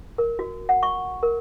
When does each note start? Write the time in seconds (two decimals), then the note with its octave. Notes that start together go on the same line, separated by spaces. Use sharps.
0.18 A#4
0.39 F#4
0.69 F#5
0.83 C#6
1.23 A#4